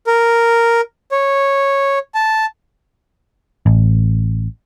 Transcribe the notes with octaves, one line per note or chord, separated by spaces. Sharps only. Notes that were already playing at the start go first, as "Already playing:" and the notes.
A#4
C#5
A5
A1